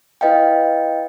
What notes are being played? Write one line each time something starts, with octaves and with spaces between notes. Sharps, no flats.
E4 B4 D#5 F5 G5